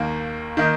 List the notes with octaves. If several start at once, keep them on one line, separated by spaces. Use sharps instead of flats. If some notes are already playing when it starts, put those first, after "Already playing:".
Already playing: D#2 D#3 A#3
D#3 A#3 D#4